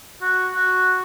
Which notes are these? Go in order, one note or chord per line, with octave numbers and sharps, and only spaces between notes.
F#4
F#4